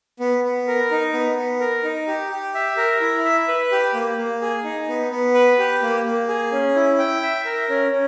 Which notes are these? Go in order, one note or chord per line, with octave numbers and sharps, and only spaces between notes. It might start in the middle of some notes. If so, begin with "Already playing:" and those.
B3
B3
A#4
D#4
B3
B3
A#4
D#4
G4
G4
E5
A#4
E4
E5
B4
G4
A#3
A#3
G#4
D#4
B3
B3
B4
G4
A#3
A#3
G#4
C#4
E4
G5
E5
A#4
C#4
C#4